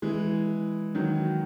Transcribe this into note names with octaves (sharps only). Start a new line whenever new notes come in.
E3 G#3
D#3 F#3